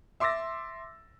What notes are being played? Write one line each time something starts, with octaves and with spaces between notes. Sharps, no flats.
E5 C6 D6 E6 A6 A#6